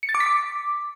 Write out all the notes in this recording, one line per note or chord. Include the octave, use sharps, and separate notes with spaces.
C#7
A6
D6
B6
D6